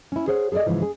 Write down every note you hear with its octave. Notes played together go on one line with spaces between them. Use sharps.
C#4 E4
G#4 C5 C#5 F#5
G#4 A4 B4 D5 D#5
G#2 C#3 E3 F3
G#4